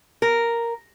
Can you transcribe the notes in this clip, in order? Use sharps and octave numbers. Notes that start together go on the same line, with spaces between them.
A#4